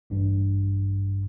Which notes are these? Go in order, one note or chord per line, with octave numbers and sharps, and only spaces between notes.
A1 G2